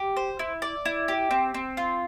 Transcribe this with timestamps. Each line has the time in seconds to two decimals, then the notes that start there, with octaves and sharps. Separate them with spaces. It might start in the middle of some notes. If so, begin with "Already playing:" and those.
Already playing: G4
0.17 C5
0.39 E4
0.62 D5
0.85 E4
1.08 G4
1.31 C4
1.54 C4
1.77 F4